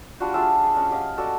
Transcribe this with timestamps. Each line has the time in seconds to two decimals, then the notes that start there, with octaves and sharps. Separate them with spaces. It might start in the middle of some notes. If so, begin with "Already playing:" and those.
0.20 G3 D4 F4 F#4
0.34 D4 F4 G#4 E5
0.63 G#4
0.76 C#4 D#5 F#5
0.90 G4 D#5 F5
1.17 F#4 A4 D5 D#5